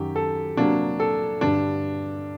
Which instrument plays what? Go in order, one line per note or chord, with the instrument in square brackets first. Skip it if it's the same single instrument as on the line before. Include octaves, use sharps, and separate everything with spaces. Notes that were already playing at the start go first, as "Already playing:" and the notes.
Already playing: [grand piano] F#2 D#3 F#3 G4
A4
C3 F#3 A#3 D4
A4
G2 D3 G3 D4